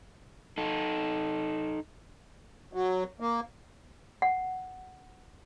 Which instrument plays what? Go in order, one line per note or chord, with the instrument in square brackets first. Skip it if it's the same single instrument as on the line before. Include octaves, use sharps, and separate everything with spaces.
[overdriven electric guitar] D#4 A4
[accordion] F#3
A#3
[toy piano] F#5